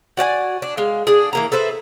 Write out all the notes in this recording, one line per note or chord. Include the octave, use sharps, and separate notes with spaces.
F#4 D5 D#5 G#5
D4
G#3 F5
D4 G#4
E3 A#3 A#5
A4 B4 C5 E5